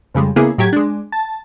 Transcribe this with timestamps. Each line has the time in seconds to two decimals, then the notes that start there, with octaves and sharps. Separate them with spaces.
0.14 F2 C#3 G3 G#3
0.36 C#3 A#3 B3 E4 G#4
0.58 A2 F#3 G4 G#6
0.73 G#3 D4
1.12 A5